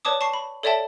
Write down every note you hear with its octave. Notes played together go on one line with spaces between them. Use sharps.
B4 C#5 D5 A5 D6 D#6
A5 C#6 C7
B5
A4 C#5 D5 E5 G5 A5